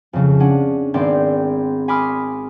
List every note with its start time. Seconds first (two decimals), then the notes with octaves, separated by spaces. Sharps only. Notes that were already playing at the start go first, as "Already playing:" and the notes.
0.13 F2 C#3 F3
0.40 C#4 D4 F#5
0.94 G#1 B3 C4 D5 G5 C6
1.88 G#5 B5 C6 D6 D#6 F6